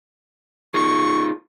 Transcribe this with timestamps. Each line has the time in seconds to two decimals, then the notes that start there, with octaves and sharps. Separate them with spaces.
0.74 D#4 F4 G#4 C#6